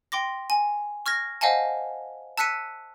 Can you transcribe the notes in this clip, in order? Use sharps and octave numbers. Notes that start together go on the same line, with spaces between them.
G5 C6 D6 A#6
G#5
C#6 F6 G#6 A#6
C5 D#5 F5 F#5 G#5 A5
A5 E6 F#6 B6 C#7 D#7